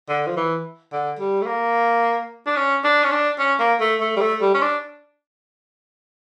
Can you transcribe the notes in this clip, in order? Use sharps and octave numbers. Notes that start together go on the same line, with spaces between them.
D3
F3
E3
D3
G3
A3
A#3
D4
C#4
D4
C#4
D4
C#4
A#3
A3
A3
G3
A3
G3
C#4
D4